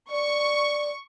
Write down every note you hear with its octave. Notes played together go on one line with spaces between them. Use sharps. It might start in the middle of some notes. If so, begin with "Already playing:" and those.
D5 C#6